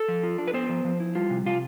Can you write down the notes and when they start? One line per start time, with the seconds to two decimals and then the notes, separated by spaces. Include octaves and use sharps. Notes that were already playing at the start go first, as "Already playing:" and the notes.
Already playing: A4
0.08 F3
0.23 F4
0.38 D4
0.48 B4
0.54 B3 C5
0.69 F3
0.84 F3
1.00 E4
1.15 G3 F4
1.30 C3
1.46 C3 F4